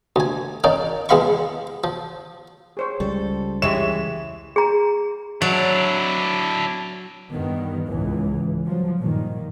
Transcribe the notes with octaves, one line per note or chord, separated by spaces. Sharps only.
D2 G#5
A#3 C#4 D#4 D5
E2 G#3 B3 F5 B5 C#6
F3
G#4 C5 C#5
C#2 G3 A4
E3 G#3 G4 G#4 C#5 E5 E7
G#4 A#5
F#3 D4 E4
G2 D#3 B3
C#2 G#2 E3
F3 F#3
G2 A#2 D#3